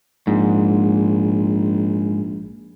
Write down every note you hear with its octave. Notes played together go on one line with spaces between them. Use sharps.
A#1 G#2